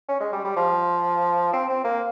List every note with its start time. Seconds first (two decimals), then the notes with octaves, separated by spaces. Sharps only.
0.08 C#4
0.20 G#3
0.32 G3
0.44 G3
0.56 F3
1.53 C4
1.69 C4
1.84 A#3